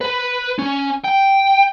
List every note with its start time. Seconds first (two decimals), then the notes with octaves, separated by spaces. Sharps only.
0.01 B4
0.59 C#4
1.04 G5